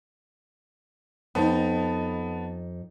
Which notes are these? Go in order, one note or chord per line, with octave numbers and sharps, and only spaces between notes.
F2 B3 D#4 A5